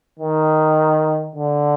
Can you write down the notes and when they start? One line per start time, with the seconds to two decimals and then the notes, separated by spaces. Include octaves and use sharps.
0.20 D#3
1.36 D3